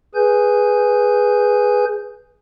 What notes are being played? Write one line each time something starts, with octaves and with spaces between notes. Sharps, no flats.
G#4 B4 G#5 G6